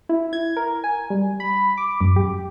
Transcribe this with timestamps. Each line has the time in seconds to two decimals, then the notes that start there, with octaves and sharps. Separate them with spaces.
0.09 E4
0.33 G#6
0.57 A#4
0.84 G#5
1.10 G3
1.40 B5
1.78 D6
2.01 F#2
2.16 G4